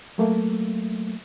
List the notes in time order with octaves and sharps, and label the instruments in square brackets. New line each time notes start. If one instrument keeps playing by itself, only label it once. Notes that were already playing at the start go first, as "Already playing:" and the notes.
[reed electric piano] F#3 A3 A#3